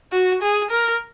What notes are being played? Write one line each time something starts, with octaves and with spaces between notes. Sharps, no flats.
F#4
G#4
A#4